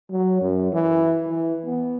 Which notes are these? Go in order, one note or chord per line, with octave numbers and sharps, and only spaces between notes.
F#3
F#2
E3
E3
B3